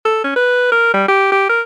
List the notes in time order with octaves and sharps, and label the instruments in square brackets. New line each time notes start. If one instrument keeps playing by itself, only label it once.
[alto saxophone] A4
C#4
B4
A#4
G3
G4
G4
A#4